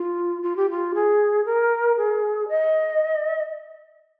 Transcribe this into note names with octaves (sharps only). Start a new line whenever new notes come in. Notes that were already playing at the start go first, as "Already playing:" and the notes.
Already playing: F4
F4
G4
F4
G#4
A#4
G#4
D#5